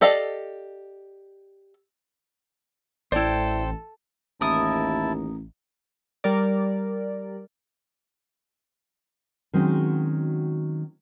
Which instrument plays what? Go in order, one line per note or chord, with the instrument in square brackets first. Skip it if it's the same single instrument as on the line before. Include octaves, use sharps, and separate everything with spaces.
[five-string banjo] G4 A4 D5 D#5 F5
[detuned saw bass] A1 [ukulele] E4 D5 [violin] A4 [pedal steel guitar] C5 G5
[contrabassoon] A1 [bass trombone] D#2 [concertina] E4 A5 [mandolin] A#4 D#6
[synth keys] G3 A#4 D5
[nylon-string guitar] D#3 F#3 G#3 C4 C#4 F#4